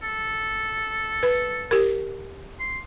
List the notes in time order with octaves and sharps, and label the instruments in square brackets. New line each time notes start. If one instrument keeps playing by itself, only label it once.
[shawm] A4
[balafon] B4
G4 A#4
[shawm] C6